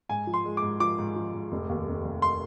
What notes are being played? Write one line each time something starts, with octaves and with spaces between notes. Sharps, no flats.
G#2 G#5
F3
C6
G#3
D6
G#2
F3 D6
G#2
F3
G#2
F1
D#2
F1
F1
C6